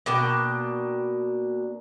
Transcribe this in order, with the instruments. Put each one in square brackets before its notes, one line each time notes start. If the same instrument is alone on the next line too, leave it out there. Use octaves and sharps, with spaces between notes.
[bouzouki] B2 A#3 D4 G5